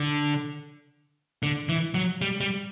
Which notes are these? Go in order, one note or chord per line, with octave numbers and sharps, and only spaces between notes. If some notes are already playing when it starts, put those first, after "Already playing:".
Already playing: D3
D3
E3
F#3
G3
G3